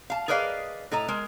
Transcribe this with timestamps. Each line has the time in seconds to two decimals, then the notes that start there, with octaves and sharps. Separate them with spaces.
0.10 F5 A5
0.28 G#4 A#4 B4 D5 D#5 F5
0.92 A2 A4 D#5 A#5
1.08 G#3 A#4